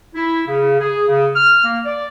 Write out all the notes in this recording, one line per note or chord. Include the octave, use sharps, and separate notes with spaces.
E4
C#3
G#4
C#3
F6
A#3
D5